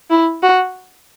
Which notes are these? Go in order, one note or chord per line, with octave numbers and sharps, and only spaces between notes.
E4
F#4